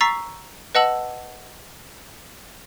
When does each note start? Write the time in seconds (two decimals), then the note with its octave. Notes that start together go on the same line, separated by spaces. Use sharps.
0.01 A#5 C#6 E6 A6 B6 C7
0.75 B4 D#5 F#5 A5 E6 F#7